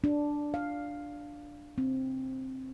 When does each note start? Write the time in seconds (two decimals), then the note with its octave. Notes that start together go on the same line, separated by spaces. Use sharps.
0.04 D4
0.54 F5
1.78 C4